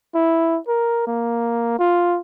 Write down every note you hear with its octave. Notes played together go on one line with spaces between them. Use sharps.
E4
A#4
A#3
F4